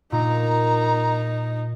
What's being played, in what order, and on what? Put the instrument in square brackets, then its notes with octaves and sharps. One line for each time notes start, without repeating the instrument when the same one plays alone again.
[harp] A#2 [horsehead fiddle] D#4 [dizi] A#5